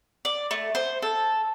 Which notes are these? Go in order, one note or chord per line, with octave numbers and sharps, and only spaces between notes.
D5
A3
C5
A4